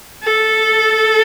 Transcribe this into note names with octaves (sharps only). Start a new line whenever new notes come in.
A4